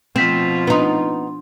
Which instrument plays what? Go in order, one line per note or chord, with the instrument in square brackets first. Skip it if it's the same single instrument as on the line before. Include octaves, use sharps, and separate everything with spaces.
[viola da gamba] B2 F3 F4 [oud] C4 [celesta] B6 E7
[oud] B3 D#4 [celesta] D4 C6